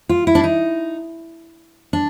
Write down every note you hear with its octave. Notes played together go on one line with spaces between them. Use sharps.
F4
E4
D4
D#4
D4